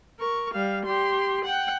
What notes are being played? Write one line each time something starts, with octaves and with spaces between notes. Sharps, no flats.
A#4 C#6
G3 F5
G4 C6
F#5 G5